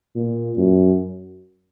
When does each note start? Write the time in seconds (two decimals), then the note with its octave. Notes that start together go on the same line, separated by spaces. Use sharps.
0.15 A#2
0.57 F#2